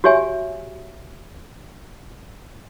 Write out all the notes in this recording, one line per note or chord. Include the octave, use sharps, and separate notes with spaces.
F#4 G4 C#5 E5 G#5